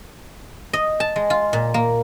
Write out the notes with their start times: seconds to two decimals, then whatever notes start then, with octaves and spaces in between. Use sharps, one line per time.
0.73 D#5
1.00 A5
1.16 G#3
1.30 F4
1.53 A#2
1.74 A#3